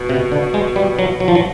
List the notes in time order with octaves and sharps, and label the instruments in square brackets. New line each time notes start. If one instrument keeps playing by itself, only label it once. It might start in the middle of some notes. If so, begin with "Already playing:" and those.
Already playing: [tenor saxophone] B2
[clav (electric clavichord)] C3
D3
G#3
G3
F#3
F#3
F3
F#3